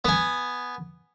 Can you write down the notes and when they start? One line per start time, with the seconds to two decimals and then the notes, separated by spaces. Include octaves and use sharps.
0.05 B3 G#5